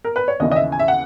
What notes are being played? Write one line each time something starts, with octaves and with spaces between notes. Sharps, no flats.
A#4
B4
C#5
D#2 C#3 E3 D#5
D#5
E5
G#5
E5
F#5